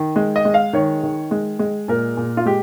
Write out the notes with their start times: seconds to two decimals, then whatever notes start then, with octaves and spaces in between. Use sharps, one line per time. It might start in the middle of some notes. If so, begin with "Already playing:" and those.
Already playing: D#3
0.16 G#3
0.36 D#5
0.45 G#3
0.54 F5
0.73 D#3 C#5
1.03 D#3
1.31 G#3
1.59 G#3
1.88 A#2 A#4
2.17 A#2
2.37 F4
2.45 G#3 G4